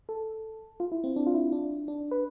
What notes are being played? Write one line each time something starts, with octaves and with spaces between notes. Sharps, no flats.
A4
F4
E4
C4
D4
F4
E4
D4
D4
B4